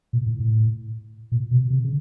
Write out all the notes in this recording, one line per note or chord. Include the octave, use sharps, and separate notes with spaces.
A#2
A2
A2
A#2
B2
C3
C#3